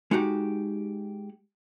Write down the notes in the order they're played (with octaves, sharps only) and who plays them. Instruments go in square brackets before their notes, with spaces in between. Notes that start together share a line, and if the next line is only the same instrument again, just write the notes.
[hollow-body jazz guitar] G#3 D#4 F#4 G4